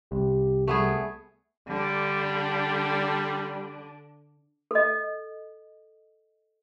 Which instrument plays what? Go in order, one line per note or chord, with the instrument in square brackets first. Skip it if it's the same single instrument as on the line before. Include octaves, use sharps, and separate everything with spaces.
[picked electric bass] C2 [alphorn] G4
[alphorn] G3 [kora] A3 B3 G#4
[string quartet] D3 D4 [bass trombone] G3
[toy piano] A4 D#5